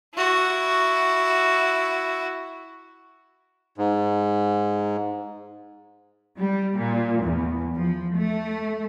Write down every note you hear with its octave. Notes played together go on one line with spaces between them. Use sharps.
E4 F#4
G#2
G3
A#2
E2
F3
A3